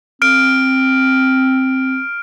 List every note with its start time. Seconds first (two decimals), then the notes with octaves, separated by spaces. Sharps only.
0.22 C4 F6 D7